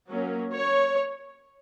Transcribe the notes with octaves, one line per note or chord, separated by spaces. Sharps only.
F#3 A#3 C#4
C#5